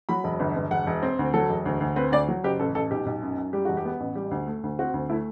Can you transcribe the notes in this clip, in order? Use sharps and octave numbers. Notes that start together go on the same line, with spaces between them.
F#3 B5
E1
G1
G1
E1 F#5
E1
C4
D2
F#3 A4
E1
D2
D2
C4 B4
D2 D5
F#3
F#1 G4
A1 A4
A1 A4
B1 G4
B1
F#2
F#2
G3 G4
E1 F#4
G4
B3
A1
G3 G4
D2
A3
D2
C4 F#4
D2
A3 E4